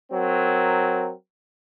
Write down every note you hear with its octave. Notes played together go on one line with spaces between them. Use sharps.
F#3 C4 A#4